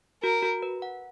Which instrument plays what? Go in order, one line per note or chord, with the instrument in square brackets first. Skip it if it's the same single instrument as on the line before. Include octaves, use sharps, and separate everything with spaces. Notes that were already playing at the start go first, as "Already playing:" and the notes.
[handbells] F#4 [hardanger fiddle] A#4
[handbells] F#4
B4
F#5